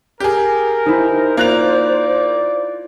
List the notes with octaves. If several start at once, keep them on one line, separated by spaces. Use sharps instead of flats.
G4 G#4 A#4
D#4 E4 C5
A#3 F4 D5 F#6 F7